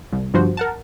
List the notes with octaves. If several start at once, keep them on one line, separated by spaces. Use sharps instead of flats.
C2
G1 G2 F3 F#4 C5
A#4 F#5 A5